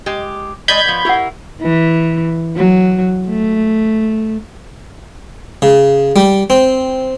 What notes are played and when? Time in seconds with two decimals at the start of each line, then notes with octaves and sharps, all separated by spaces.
0.06 G#3 G4
0.68 G#3 D5 D#5 B5 G6 G#6
0.85 F3 B3
1.05 E4 G4 A#4 F#5
1.62 E3
2.56 F#3
3.28 A3
5.62 C#3
6.16 G3
6.50 C4